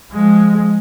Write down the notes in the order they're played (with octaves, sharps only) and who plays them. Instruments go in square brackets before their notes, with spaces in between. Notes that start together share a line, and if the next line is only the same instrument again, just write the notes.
[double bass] F3 G#3